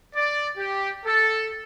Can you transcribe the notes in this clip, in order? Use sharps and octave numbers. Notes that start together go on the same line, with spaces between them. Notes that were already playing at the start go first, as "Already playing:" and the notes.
D5
G4
A4